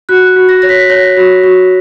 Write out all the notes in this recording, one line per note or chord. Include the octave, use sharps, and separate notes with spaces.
F#4 F#6
F#4
A#6
C#5 A#6
B6
C#5 A#6
F#4
F#4